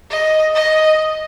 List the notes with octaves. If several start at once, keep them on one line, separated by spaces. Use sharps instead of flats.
D#5
D#5